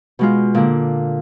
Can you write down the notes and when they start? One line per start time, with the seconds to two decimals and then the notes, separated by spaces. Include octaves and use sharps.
0.19 B2 G#3 F4
0.54 A#2 D3